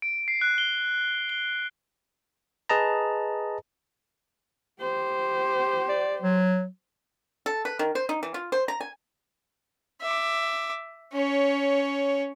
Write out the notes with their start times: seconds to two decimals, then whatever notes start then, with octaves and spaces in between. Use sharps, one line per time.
0.02 D7
0.28 C7
0.41 F#6
0.58 G7
1.29 G7
2.69 G#4 B4 D#5 A5 A#5
4.80 G4 C5
5.89 D5
6.22 F#3
7.46 A4
7.65 B4
7.79 D#3
7.95 C5
8.09 D#4
8.23 E3
8.34 F4
8.52 C5
8.68 A#5
8.80 G#5
10.01 E5 D6
11.13 C#4 C#5